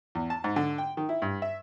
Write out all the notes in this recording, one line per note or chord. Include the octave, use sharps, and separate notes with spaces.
E2
A5
G#2
D3
G5
D#3
E4
G2
E5